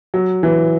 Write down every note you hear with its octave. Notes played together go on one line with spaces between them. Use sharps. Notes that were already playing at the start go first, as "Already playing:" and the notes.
F#3
E3